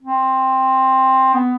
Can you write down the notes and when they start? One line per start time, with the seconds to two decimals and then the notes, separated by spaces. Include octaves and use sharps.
0.02 C4
1.33 B3